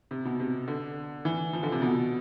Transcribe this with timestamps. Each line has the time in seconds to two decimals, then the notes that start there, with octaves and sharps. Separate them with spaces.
0.11 C3
0.25 B2
0.40 C3
0.68 D3
1.25 E3
1.53 F3
1.63 D3
1.72 C3
1.82 B2